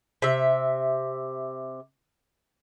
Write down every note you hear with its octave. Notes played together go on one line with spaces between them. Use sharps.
C3 E5